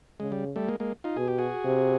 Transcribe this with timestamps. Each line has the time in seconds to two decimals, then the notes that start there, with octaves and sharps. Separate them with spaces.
0.20 C#3 G#3
0.32 G3
0.56 G3 A3
0.68 G#3 A#3
0.80 G#3 A#3
1.04 D#4 F4
1.17 B2 G#4
1.28 G4
1.38 F#4 G#4
1.65 C3